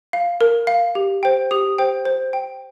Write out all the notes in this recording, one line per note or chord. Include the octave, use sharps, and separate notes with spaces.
F5
A#4
F5
G4
C5 G5
G4 D#6
C5 G5
C5
G5